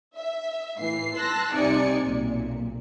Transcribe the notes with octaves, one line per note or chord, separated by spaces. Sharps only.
E5
A2 E3 C7
A5 C6 E6 F#6 A#6
C2 C3 D#4 D5 G#5 C#7
B1 A#2